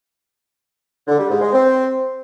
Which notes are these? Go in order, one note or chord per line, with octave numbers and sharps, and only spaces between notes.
D3
G3
G#2
G#3
C4